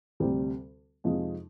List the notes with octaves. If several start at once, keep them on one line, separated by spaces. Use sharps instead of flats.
D2 C3 G3 C4
F2 C3 F3 G#3 D#4